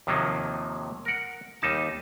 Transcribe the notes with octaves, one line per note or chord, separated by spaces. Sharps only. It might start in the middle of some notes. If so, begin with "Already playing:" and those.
D#2 C3 D#3 F3 F#3 A#3
A#4 F#5
D#2 G3 D#4 A5